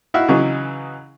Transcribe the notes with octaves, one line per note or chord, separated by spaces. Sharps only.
D#4 E4 F#4 E5 F5
C#3 E3 F#3 D#4